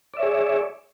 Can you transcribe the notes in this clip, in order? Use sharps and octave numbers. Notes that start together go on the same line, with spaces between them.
G#4 C#5 D5 E5